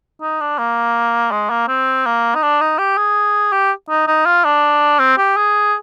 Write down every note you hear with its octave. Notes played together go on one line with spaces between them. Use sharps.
D#4
D4
A#3
G#3
A#3
C4
A#3
D#4
D4
D#4
G4
G#4
G4
D#4
D#4
F4
D4
C4
G4
G#4